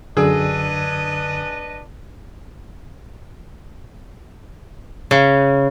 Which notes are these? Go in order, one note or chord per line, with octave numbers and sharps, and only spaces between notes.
F#2 D3 D4 G#4 B4 D#5 E6
C#3